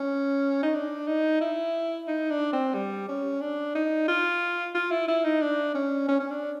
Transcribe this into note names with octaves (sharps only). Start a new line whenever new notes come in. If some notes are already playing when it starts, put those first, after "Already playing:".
Already playing: C#4
D#4
D4
D#4
E4
D#4
D4
C4
G3
C#4
D4
D#4
F4
F4
E4
E4
D#4
D4
C#4
C#4
C#4
D4